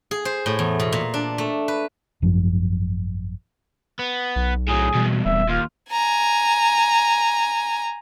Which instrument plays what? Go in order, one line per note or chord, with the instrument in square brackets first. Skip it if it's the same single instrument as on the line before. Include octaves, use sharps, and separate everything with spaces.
[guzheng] G#4
C5
A2
E2
B2
A#2
D4
A3
B4
[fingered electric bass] G#1 F#2 F3 D4
[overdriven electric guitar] B3
[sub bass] B1
[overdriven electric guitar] A2 F#3 [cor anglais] G#4
[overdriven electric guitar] E2 G2 [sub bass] B2
[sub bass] D#1 [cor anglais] E5
[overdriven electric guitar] D#2 [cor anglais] F4
[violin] G#5 A#5